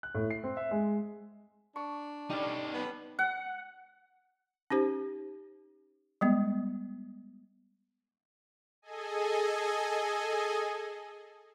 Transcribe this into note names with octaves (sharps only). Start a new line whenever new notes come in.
F#6
A2
C7
C4
E5
G#3
D4 C#6
G3 C#4 D#4 A4
B3
F#5
C#4 D#4 G4 C5
G3 G#3 B3
G#4 A4 D#5 G#5